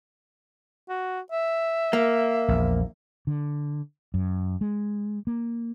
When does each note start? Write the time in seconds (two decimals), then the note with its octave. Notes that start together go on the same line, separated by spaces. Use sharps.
0.89 F#4
1.32 E5
1.93 A#3
2.48 A#1 E2
3.27 D3
4.14 F#2
4.61 G#3
5.27 A#3